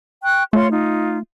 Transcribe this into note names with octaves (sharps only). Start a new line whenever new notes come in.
G5 C#6 F#6
A3 F4 C#5 C6
D#4 F4